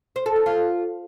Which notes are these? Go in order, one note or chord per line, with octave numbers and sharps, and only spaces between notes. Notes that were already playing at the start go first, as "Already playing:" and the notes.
C5
A4
D#4
F4